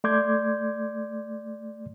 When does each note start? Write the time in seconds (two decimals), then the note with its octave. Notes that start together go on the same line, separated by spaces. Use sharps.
0.04 A3 D5 C6 D6 G6 G#6